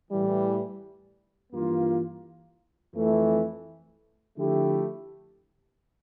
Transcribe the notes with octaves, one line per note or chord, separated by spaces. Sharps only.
A2 E3 G3
G2 E3 A#3 F4
F2 E3 A3
D3 F3 A3 E4 G4